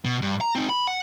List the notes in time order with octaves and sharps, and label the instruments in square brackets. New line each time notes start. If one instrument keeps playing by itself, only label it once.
[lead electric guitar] B2
G2
A#5
C4 D#4
B5
F#5